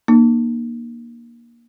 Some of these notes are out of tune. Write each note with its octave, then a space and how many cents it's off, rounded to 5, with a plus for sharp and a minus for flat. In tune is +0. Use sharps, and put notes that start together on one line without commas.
A#3 +15 D#4 -45